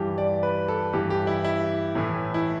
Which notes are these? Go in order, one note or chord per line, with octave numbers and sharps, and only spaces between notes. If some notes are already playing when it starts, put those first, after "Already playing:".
Already playing: G2 E3 G4
D5
B4
A4
G2 E3 G4
G4
E4
E4
A2 E3
E4